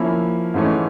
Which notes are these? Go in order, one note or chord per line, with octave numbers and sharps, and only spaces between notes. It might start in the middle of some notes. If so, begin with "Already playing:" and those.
Already playing: F3 A#3 C#4 E4
G#2 E3 A3 C#4